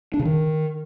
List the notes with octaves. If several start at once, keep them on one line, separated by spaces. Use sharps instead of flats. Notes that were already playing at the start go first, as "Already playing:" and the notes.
D4
C#3
D#3